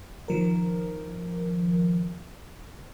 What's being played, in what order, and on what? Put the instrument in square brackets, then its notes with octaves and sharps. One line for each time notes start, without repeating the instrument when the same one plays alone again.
[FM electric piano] D#3 F3 A#4